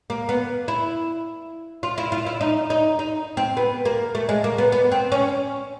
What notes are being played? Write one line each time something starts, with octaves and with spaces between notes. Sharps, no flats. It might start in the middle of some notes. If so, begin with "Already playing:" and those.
A#3
B3
E4
F4
E4
F4
E4
D#4
D#4
D#4
C4
B3
A#3
A3
G#3
A#3
B3
B3
C4
C#4